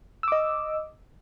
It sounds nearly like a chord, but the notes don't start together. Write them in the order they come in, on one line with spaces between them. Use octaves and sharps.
E6 D6 D#5